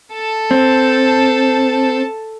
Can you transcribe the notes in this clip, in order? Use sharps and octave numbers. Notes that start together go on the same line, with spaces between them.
A4 A5
C4